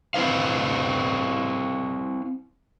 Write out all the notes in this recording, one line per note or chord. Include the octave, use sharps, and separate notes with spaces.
C4 E4 B4 C5 F5